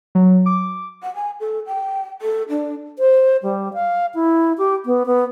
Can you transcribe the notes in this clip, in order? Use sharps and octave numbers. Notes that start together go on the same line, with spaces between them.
F#3
D6
F#5
G#5
A4
G5
A4
D4
C5
G3
F5
E4
G4
B3
B3